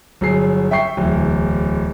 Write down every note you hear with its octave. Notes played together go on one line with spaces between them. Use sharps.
G1 F#3 G#4 C7
E5 G5 C#6 C7
D1 E2